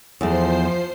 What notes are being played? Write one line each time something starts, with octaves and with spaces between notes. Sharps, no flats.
E2 F3 A3 C5 C7